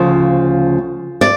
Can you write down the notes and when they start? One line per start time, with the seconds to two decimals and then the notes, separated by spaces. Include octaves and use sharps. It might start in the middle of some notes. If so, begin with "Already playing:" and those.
Already playing: D2 C#3 F3
1.21 D5